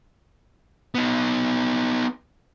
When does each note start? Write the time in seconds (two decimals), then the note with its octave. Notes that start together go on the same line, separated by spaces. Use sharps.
0.95 B3 D#4